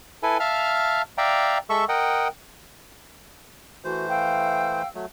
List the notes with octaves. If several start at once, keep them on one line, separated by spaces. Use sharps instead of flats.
E4 A4 B4 G#5
E5 F5 A5 F6
D5 E5 F5 G5 A#5
G#3 A4 E5 C#6 E6
A#4 D#5 F#5 G5
E3 A3 F#4 C5
F5 G5 E6
F#3 A3